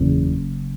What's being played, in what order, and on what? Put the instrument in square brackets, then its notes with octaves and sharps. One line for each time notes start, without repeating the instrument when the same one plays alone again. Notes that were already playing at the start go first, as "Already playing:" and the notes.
Already playing: [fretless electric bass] F#1 E2 C#3